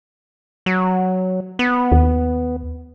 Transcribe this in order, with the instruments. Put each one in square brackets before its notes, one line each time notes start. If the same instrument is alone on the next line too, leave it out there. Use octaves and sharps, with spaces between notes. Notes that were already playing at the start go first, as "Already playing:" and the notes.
[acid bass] F#3
B3
[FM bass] D#2